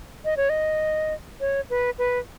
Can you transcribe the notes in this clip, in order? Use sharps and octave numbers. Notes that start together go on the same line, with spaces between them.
D#5
C#5
D#5
C#5
B4
B4